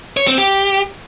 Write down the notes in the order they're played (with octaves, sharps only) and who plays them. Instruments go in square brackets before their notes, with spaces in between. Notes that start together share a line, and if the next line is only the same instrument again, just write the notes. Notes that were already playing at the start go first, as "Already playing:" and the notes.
[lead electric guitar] C#5
C4
G4